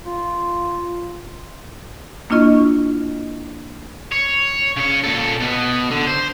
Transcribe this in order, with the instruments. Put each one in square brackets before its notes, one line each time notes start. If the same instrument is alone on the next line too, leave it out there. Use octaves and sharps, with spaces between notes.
[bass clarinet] F4
[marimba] A#3 D4 E4 F4 D#5 C#6
[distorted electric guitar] C#5
C#3 C#5
A#2 A4
B2 B3
D3
C5